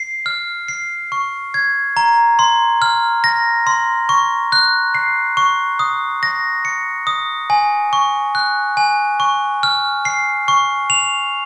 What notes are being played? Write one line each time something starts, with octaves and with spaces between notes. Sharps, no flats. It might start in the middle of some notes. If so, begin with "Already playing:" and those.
Already playing: C7
F6
C7
C#6
G#6
A#5
C6
F6
A#6
C6
C#6
F#6
C7
C#6
D#6
A#6
C#7
D#6
G#5
C#6
F#6
G#5
C#6
F6
C7
C#6
F7